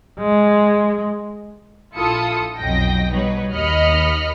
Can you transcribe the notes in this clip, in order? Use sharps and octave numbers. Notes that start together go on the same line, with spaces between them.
G#3
A#1 E4 F4 A4 D#6 C#7
B1 F2 F#3 D#5 G5 A#6
B2 G3 D#4 B4 C#5
D#2 D#5 B5 F6 C#7